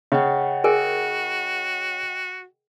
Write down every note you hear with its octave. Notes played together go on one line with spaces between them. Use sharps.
C#3 D#5 F#5 G5
F#4 G#4 A#4 G#5